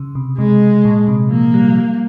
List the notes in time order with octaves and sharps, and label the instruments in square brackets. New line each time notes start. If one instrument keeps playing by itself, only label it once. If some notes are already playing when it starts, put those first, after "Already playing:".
Already playing: [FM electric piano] C#3
C3
[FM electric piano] C3 [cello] G#3
[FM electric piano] A#2
C3
[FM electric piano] F3 [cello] A#3
[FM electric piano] G3
F3
G3